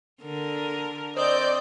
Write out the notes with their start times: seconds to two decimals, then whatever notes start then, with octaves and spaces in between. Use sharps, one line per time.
0.22 D3 A#4
1.17 C4 C5 D5 D#5 G6